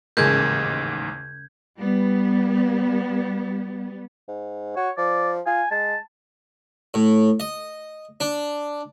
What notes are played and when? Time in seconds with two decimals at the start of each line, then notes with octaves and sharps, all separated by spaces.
0.17 A1 D#2 G#2 C#3 G#4 A#4 G6 G#6
1.78 G3 B3
4.28 G#2
4.76 F#4 C#5
4.97 F3 D5
5.46 F4 G#5
5.71 G#3 A5
6.94 A2
7.40 D#5
8.20 D4